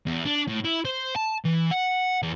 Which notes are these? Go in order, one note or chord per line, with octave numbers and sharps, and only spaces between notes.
E2
D4
A2
E4
C5
A5
E3
F#5
E2